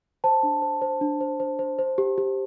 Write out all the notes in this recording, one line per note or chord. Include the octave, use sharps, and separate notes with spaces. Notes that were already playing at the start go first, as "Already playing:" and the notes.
C5 A5
D4
C5
C5
D4
C5
C5
C5
C5
G4
G4